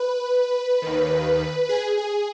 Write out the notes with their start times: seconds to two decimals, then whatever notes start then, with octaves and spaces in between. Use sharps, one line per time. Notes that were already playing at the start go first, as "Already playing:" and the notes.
Already playing: B4
0.82 D#2 D#3
1.69 G#4
1.97 G#4